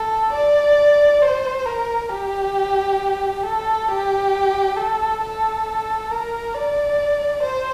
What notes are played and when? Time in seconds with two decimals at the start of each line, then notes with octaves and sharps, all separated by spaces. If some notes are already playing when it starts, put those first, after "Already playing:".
Already playing: A4
0.32 D5
1.22 C5
1.66 A#4
2.10 G4
3.43 A4
3.88 G4
4.77 A4
5.22 A4
6.11 A#4
6.54 D5
7.43 C5